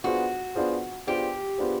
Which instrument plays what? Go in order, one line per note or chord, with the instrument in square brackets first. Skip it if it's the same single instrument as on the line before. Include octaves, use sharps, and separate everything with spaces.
[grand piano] B3 D4 F4 G#4 C5 [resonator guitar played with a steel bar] F#4
[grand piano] B3 D4 F4 G#4 C5
[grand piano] B3 D4 F4 G#4 C5 [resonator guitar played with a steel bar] G4
[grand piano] B3 D4 F4 G#4 C5